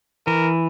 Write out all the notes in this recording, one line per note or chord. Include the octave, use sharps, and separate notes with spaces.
E3 A#4